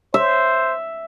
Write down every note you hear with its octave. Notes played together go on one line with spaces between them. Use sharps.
C5 E5